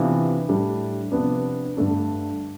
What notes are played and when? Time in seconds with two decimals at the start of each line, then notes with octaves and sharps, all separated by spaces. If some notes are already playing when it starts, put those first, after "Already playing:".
Already playing: C3 E3 B3 D4 F4
0.49 A2 G3 D4
1.12 C3 F3 B3 D4
1.77 G2 D3 A3 D4